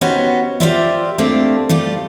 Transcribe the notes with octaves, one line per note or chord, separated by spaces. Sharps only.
B3 C#4 D#4 F#4 G4 C5
F4 G4 A#4 C5 D5 E5
A3 A#3 C4 D4 G4
G3 A3 F4 G4